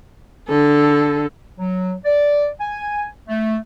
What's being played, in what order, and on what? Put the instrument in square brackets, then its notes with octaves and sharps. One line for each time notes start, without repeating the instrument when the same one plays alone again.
[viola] D3 A4
[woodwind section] F#3
D5
G#5
A3